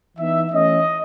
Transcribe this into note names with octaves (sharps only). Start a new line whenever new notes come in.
E3 B3 D#4 E5
E3 A3 C#4 D#5